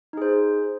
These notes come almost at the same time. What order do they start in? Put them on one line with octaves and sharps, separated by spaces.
D#4 G#4 C5